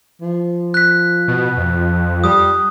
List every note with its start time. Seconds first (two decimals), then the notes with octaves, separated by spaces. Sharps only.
0.21 F3
0.74 F#6 B6
1.28 B2
1.57 F2
2.24 G3 D#6